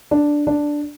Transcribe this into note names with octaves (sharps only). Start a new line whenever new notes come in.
D4
D4